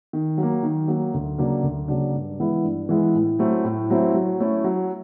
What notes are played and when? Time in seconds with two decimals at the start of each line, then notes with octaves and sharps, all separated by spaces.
0.13 D#3
0.38 F#3
0.43 A#3
0.63 D#3
0.88 F#3 A#3
1.14 D2
1.38 C#3 F#3 A#3 D4
1.63 D2
1.88 C#3 F#3 A#3 D4
2.13 G2
2.40 E3 G#3 B3 E4
2.64 G2
2.89 E3 G#3 B3 E4
3.15 A2
3.39 F#3 A3 C4 E4
3.64 A2
3.90 F#3 A3 C4 E4
4.14 F#3
4.40 A3 C#4 E4
4.64 F#3